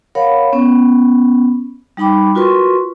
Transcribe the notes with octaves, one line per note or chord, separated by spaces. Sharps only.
A#4 C#5 F5 F#5 B5
B3 C#4
G3 D#4 G5 B5 D6
F4 F#4 A#4 B4 C6 C#6